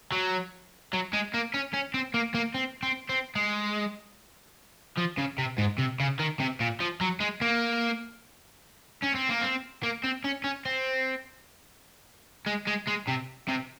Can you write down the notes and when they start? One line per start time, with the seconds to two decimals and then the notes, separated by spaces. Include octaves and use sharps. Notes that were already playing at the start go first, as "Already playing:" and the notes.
0.12 F#3
0.93 F#3
1.13 G#3
1.34 A#3
1.54 C#4
1.74 C#4
1.94 C4
2.14 A#3
2.35 A#3
2.54 C4
2.83 C4
3.09 C4
3.35 G#3
4.98 F3
5.18 C#3
5.38 C3
5.58 G#2
5.78 C3
6.00 C#3
6.19 D#3
6.40 C3
6.60 A#2
6.80 F3
7.01 F#3
7.20 G#3
7.41 A#3
9.03 C#4
9.15 C4
9.30 A#3
9.42 C4
9.83 A#3
10.04 C4
10.24 C#4
10.44 C#4
10.65 C4
12.46 G#3
12.67 G#3
12.87 G#3
13.07 C3
13.48 C3